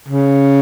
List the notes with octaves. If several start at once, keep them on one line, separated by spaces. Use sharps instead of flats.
C#3